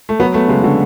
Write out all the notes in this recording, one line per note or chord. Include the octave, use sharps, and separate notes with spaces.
A3
F#3 B3
A3 B3
C#3 G#3
D3 F#4